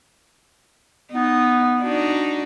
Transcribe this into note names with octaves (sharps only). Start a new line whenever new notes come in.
B3 D#4
D4 D#4 F#4